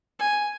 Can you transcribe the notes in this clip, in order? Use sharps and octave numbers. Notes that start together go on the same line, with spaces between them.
G#5